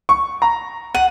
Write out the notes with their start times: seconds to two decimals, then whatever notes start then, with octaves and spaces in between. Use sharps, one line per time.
0.09 C#6
0.42 A#5
0.95 F#5 D#7